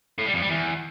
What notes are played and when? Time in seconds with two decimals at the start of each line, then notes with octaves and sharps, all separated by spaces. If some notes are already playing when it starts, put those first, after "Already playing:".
0.18 A2
0.26 G3
0.34 F2
0.42 G3
0.50 E2